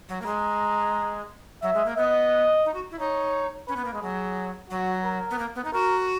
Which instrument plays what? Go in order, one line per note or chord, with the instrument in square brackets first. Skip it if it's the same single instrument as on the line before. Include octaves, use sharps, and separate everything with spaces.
[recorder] F#3
A#3
[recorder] G#3 [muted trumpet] A#5
[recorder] F#3 [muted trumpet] E5
[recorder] G#3
A#3
[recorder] B3 [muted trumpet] D#5
[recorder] D#4
F#4
E4
[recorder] D#4 [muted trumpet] C#5
[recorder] C#4 [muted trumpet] B4
[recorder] B3
A#3
G#3
[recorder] F#3 [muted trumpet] G#4
[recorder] F#3 [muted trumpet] F#4
[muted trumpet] A#4
[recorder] B3
A#3
B3
D#4
[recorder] F#4 [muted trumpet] A#4